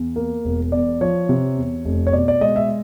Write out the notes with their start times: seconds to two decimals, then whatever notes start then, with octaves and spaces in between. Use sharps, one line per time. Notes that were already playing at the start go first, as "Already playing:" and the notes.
Already playing: E2
0.16 A#3
0.45 E1
0.72 E2 D5
1.01 F3 C#5
1.29 C3
1.57 E2
1.85 F1
2.07 C#5
2.13 B2 D5
2.28 D5
2.41 G#3 D#5
2.56 E5